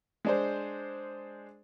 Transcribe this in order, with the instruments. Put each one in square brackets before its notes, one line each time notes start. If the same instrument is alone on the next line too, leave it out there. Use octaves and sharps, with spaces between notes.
[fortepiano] G#3 D4 C5